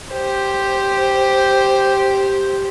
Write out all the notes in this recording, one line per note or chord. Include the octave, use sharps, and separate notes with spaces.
G4 C5